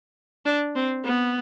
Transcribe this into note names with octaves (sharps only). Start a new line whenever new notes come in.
D4
C4
B3